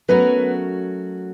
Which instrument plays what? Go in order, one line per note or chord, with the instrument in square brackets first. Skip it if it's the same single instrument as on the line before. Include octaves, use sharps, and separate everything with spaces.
[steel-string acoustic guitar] F#3 A3 C#4 F#4 A#4 [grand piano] B3 B4